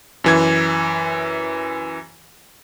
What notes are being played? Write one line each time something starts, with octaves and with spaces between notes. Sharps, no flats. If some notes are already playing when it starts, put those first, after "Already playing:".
F#2 E3 G#6